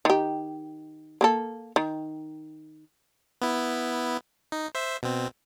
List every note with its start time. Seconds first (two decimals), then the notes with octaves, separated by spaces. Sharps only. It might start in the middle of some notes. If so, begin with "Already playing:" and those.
0.05 D#3 G4
1.21 A#3 G#4 A4
1.76 D#3
3.42 B3 E4
4.52 D#4
4.75 C5 E5
5.03 B2 C4